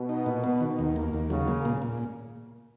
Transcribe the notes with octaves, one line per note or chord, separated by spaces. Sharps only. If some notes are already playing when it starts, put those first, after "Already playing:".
Already playing: B2
D#4
A#2
B3
D#3
D#2
A#3
D#2
C#3 F#3
A#3
A#2
A#2